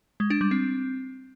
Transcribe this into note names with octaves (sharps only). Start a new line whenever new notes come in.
G#3
D4
G3
C4